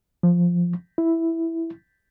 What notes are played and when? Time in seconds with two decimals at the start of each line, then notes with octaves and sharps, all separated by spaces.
0.23 F3
0.98 E4